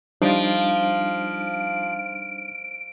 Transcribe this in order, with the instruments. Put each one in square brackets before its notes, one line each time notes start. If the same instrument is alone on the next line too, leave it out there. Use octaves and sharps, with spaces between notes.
[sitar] F3 [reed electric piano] G3 D4 D#4 [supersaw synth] D7